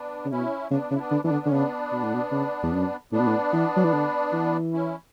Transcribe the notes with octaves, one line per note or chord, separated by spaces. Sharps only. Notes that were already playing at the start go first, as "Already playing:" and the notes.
Already playing: B3 D4
C#3
B2 C#4 E4
C#3 B3 D4
C#3
E4
B3 D4
D3
E3 B3 D4
D3
D3 C#4
C#3 B3 D4
B2
A2
B2
C#3
E2
F#2
A2 B3 D4
B2
A2
E3
F#3
E3
D3
E3
C#4 E4